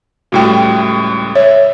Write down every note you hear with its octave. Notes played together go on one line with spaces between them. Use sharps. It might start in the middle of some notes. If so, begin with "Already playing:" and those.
C#2 A2 G3 F#4 G5
C#5 E5